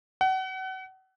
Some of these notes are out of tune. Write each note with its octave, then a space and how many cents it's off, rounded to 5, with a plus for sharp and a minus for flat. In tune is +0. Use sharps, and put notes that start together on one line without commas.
F#5 +35